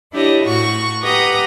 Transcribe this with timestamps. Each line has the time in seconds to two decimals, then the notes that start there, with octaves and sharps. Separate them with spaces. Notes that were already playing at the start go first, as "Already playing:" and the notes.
0.12 D4 E4 G4 C#5 D#5
0.44 A2 F#4 C#6
1.02 G4 B4 D#5 F#5 A#5